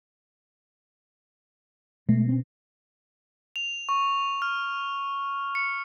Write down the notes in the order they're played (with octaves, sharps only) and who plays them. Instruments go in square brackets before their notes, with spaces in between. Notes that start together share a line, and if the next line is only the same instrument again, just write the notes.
[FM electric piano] B2 [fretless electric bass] G#3 A3
[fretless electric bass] C4 C#4
[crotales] F7
C#6
F6
C#7